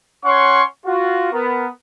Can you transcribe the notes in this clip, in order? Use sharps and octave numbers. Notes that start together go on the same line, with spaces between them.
C#4 C#5 F#5 C6 C#6
F4 F#4
B3 A#4